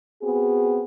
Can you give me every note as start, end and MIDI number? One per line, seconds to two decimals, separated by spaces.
0.22 0.85 59
0.22 0.85 60
0.22 0.85 66
0.22 0.85 68